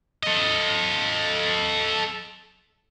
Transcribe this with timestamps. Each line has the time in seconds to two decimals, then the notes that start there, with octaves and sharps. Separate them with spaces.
0.23 A4 D#5